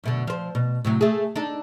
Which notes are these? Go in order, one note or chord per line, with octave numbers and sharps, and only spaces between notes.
F#2 B2 D3
F3 C5
B2
A2 C3 F#3
A3 G#4
D4 D#4 A4